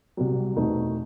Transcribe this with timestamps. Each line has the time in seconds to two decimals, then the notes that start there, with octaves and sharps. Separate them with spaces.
0.17 C2 C3 F#3
0.56 E2 B2 A3 C4 D#4